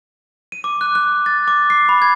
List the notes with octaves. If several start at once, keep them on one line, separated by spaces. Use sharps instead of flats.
D#7
D6
F#6
F#6
A6
D6
C7
B5
G#6